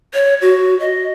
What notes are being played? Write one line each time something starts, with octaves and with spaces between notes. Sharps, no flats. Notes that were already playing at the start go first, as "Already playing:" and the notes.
C#5
F#4
D#5